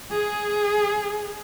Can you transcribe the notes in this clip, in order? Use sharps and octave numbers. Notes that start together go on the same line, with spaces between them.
G#4